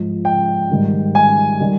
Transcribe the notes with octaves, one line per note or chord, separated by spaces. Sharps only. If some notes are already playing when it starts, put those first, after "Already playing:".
Already playing: G#2 F3
G5
G#2 D#3 G3
G#5
D#3 G3